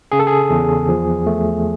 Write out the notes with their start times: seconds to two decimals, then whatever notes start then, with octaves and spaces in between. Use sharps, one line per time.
0.12 C#3 G#4
0.19 A4
0.27 G#4
0.50 E2
0.89 F3
1.27 A3